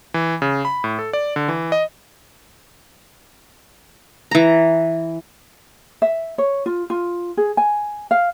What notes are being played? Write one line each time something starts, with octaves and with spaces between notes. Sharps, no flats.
E3
C#3
B5
A2
A4
D5
D3
E3
D#5
E3 A#5
E5
C#5
F4
F4
G#4
G#5
F5